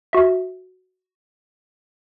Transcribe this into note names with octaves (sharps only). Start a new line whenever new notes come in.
F#4 E5